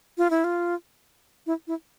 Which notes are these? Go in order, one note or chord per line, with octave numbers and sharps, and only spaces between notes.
F4
E4
F4
E4
E4